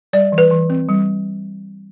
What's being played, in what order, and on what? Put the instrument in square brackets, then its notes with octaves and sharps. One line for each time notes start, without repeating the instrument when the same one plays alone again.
[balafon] G3 D5
E3
B4
E3
C4
G3